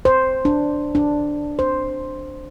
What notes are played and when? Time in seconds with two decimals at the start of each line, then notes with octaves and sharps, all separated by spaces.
0.05 C5
0.45 D4
0.95 D4
1.59 C5